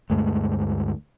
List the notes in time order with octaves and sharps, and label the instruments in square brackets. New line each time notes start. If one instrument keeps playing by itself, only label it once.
[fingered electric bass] D2 G2 G#3 A3